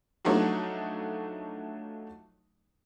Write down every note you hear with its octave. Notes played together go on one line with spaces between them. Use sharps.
F3 F#3 A3 D4 D#4 F#4